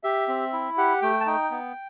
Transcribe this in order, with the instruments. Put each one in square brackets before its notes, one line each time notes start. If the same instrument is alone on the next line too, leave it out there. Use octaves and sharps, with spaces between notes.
[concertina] G4 E5
C4
E4
G4 F#5
A3 G5
A5
D#4 G5
B3